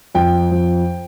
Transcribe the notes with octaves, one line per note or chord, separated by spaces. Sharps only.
F2 G5
F2